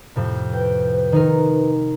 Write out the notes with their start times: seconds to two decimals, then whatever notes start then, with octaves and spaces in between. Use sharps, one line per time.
0.16 F2 A2 C3
0.53 B4 G5
1.12 D#3 D#4 A#4